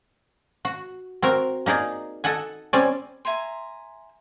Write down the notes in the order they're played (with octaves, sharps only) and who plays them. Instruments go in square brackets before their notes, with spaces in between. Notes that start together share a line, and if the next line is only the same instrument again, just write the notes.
[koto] F#4
C4 F#4 A#4
A#3 D#4 G#4 D5
A4 D#5 F#5 G#5
G3 C4 C#4 D5 G#5
[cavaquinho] E5 G#5 A#5 C6